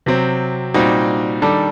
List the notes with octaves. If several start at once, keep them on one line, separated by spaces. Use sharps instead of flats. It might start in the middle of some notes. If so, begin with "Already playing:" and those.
C3 F#3 C4
A#2 G3 C4 D#4 F#4
D#3 G3 D4 A4